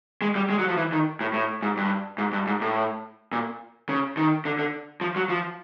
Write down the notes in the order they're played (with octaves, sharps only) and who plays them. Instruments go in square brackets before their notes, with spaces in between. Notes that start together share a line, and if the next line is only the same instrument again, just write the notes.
[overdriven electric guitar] G#3
G3
G#3
F#3
F3
E3
D#3
A2
A2
G#2
G2
G#2
G2
G#2
A2
A#2
C#3
D#3
D3
D3
F3
F#3
F3